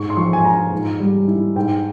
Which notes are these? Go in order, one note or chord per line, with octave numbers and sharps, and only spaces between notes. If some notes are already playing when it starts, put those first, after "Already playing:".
Already playing: G#2 C#6
C6
F3 C#6
G#5
F4 A#5
G#2
G3
E4
G#2 G5